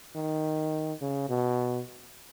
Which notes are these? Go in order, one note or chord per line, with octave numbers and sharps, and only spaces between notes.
D#3
C#3
B2